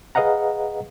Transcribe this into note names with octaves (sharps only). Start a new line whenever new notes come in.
G#4 B4 D#5 F5 F#5 A#5